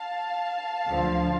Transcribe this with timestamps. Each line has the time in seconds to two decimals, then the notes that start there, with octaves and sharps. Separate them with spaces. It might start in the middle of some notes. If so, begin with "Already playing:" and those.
Already playing: F5 A5
0.86 D2 D3 F3